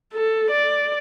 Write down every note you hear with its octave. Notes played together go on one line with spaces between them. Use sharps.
A4
D5